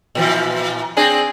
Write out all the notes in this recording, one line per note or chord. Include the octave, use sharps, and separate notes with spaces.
A#2 E3 F3
C4 D4 G#4